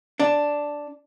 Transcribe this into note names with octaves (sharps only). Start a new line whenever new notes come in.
D4